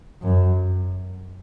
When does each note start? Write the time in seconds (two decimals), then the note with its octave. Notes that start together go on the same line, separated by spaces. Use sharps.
0.22 F#2